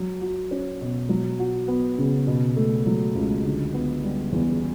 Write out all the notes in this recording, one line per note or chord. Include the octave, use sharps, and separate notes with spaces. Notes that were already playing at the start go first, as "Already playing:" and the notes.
Already playing: F#3
F#4
C#4
B2
F#3
F#4
B3
C#3
B2
A3
F#3
C#2
D3
B3
G3
E2